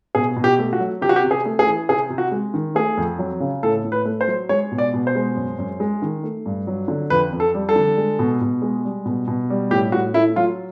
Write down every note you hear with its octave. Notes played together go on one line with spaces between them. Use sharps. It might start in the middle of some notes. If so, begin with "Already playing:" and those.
B2 G#4
B2
G4
A3
F#4
F#3
C3 G4
F#4
G4
C3
G#4
A3
G#4
E3
C3 G#4
C3
F#4
G#3
D#3
A3 G#4
F2
F#3
C#3
A2 A4
A2
B4
A3
C5
F#3
G#3 C#5
B2
D5
B2
C5
G#3
F#2
F#2
G#3
D#3
A3
G2
F#3
D3
F2 B4
F2
A4
G3
A4
D3
G#3
B2
B2
G#3
G3
B2
B2
G3
A2 G4
A2 F#4
A3 E4
F#3 F4